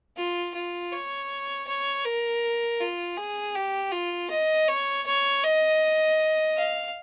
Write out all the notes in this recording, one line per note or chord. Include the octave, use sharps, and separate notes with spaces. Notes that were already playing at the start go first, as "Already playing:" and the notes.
F4
F4
C#5
C#5
A#4
F4
G#4
G4
F4
D#5
C#5
C#5
D#5
F5